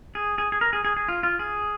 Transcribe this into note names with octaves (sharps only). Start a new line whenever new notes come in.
G#4
G#4
G#4
A#4
G#4
G#4
G#4
F4
F4
G#4